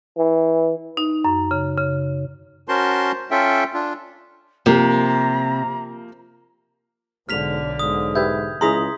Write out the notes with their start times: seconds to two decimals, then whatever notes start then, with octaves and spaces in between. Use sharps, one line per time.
0.18 E3
0.97 D#4
1.25 F#2
1.51 C#3
1.78 C#3
2.68 C#4 F#4 A#4 C5 A5 C6
3.31 C#4 F4 A4 E5 G5
3.74 D4 F4
4.66 C3 F3 A#3 A#5
7.29 B1 G#2 D3 F6 B6 F7
7.79 G#2 D#6
8.16 G4 B4 E5 G6 G#6
8.61 C#2 E4 G#4 A#5 C6 D#6 B6